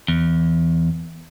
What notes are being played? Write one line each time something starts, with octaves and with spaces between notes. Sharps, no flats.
E2